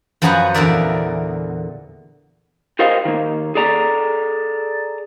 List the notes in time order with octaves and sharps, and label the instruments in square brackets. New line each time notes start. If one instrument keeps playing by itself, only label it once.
[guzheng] F#2 F3 F#3 G#4 B4 F#5
E2 A#2 D3 A#4 D5 E5
[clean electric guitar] G4 A#4 C5 D#5 F5 G5
D#3 A#3
G#4 A4 D5 A#5